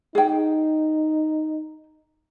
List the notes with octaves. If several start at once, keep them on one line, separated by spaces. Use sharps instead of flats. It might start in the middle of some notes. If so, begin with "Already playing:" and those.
D#4 G#4 G5